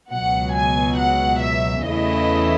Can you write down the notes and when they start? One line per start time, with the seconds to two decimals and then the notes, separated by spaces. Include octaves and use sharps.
0.11 C#2 B2 F#3 F#5
0.55 G#5
0.98 F#5
1.42 E5
1.85 E2 C#3 E3 A3 E4 D#5